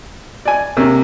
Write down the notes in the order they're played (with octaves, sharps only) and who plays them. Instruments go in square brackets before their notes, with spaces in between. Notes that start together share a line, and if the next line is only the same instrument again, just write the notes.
[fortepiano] D5 G#5
[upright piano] C3 [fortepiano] A#3 C#4